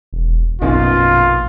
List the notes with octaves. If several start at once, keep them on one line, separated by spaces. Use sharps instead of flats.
E1
A#1 F#2 B2 D#4 F4